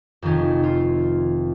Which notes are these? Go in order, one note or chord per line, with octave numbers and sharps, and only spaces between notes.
F1 F2 D#3 C#4
F4